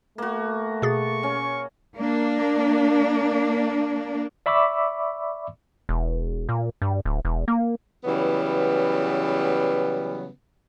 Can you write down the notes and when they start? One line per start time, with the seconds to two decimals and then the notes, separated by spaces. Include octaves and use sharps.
0.18 A3 A#3 F#4
0.82 B2 G#4 C#6 A6
1.23 C#4
1.95 A#3 D4
4.46 D5 E5 B5 C#6 D6 E6
5.89 E1
6.49 A#2
6.82 G2
7.05 D1
7.25 E1
7.48 A#3
8.05 C#3 E3 F#3 G3 B3